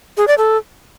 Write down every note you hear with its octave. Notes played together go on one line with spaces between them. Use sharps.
G#4
D5
A4